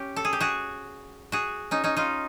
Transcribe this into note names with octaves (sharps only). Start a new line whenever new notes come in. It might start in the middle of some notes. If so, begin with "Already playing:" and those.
Already playing: C#4 G4
A4
G#4
G4
F#4 G#4
F#4 G#4
C#4 D#4
C#4 D#4
D#4 F4